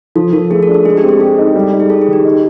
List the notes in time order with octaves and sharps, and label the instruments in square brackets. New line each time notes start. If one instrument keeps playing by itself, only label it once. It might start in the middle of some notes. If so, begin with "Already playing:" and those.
[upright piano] F3 [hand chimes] A4
[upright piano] F3 [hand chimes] A#4
[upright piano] A3 [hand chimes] G#4
[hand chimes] A#4
[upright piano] D4
[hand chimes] A4
[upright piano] G#3 [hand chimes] G#4
[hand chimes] G4
[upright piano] C4
[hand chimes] G#4
[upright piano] G4 [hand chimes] A4
[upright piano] D#4
G3
D#4
[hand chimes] G#4
[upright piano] D#4 [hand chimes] A4
[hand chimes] G#4
[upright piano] D#3 [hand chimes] G4
[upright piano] D#4